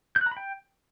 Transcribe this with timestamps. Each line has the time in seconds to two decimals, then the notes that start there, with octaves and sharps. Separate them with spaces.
0.16 G6
0.21 F#6
0.26 A#5
0.31 B5
0.37 G5